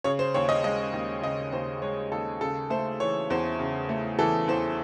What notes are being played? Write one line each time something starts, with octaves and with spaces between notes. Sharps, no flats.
C#3 C#5
C5
D#2 C#5
D#5
G#3 D#5
D#2
C#3 D#5
D#2 C5
G#3 C#5
D#2 A4
C#3 A4
A3 C5
E3 C#5
E2 C5
C#3
A3
E3 A4
E2 C5